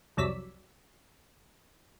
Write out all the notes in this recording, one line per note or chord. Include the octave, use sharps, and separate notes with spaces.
C2 F2 F#3 D5 E6 B6